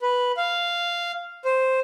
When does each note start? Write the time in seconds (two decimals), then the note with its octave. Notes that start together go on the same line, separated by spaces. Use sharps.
0.02 B4
0.37 F5
1.45 C5